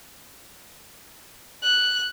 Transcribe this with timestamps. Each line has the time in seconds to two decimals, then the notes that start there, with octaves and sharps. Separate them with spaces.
1.63 F#6